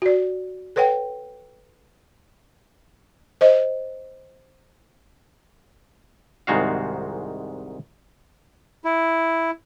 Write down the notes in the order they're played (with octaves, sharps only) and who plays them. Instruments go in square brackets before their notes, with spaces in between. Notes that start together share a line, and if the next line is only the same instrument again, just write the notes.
[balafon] F#4 D5
A4 B4 C#5 F#5 G5
C5 D#5
[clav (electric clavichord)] C2 G#2 D#3 G#3 F#4 F5
[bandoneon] E4